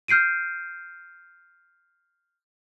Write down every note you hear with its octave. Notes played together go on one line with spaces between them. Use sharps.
F6 G6 C7 D7 D#7